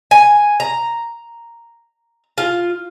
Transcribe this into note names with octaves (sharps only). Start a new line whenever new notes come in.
G#5
A#5
F4